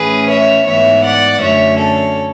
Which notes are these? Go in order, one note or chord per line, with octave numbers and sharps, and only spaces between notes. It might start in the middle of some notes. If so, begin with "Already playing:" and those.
Already playing: A2 E3 A3 C#4 G#4 B4
C#5 E5
G#2 E3 B3 C#5 E5
D5 F#5
F#2 D3 A3 C#4 C#5 E5
A4 C#5